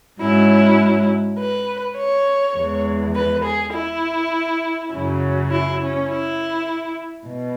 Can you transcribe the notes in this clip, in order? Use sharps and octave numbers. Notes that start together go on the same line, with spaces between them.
G#2 F#3 C#4 E4
B4
C#5
E2 E3 G#3
B4
G#4
E4
F#2 C#3 F#3 C#4
E4
C#4
E4
B2